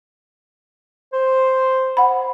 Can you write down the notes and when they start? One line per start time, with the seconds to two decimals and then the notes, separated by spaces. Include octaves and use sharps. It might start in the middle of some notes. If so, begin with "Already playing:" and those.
1.13 C5
1.97 F#5 B5